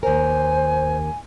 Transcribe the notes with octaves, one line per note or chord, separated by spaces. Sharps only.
D#2 A#4 C5 G#5